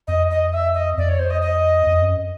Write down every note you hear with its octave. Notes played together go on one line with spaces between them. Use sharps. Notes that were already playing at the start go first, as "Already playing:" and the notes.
F2 D#5
D#5
E5
D#5
F2 D5
C#5
C5
D#5
D#5
F2
F#2